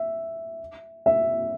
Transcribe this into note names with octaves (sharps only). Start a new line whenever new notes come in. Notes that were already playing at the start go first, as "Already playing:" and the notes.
Already playing: E5
E5